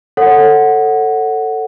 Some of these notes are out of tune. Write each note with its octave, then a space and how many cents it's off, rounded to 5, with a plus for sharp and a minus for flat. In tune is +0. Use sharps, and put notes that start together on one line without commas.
A4 +15 C#5 -10 F#5 +0